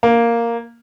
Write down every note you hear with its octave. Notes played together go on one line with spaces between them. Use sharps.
A#3